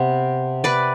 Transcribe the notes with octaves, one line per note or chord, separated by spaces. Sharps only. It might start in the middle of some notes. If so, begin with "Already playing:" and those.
Already playing: C3 B3
B4 D5